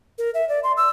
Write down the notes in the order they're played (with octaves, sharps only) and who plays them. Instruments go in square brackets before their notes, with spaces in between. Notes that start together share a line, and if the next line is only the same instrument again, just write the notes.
[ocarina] A#4
E5
D5
C6
E6